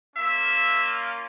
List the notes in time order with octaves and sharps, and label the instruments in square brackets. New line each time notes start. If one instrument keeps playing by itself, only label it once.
[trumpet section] A#3 C#4 F4 E5